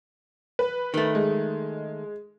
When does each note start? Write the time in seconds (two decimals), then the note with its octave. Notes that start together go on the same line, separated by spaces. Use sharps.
0.59 B4
0.94 D#3 A3
1.15 G#3